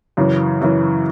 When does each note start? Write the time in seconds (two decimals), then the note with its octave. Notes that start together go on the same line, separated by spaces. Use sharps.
0.17 F#2 C#3 E3
0.61 F#2 C#3 E3